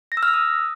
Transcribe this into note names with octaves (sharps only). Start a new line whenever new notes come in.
A#6
E6
F6
E6
D#6